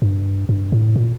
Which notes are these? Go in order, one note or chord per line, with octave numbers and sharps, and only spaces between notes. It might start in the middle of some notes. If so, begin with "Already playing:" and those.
G2
G2
A2
A#2